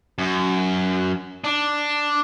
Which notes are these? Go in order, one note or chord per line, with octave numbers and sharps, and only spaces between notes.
F#2
D4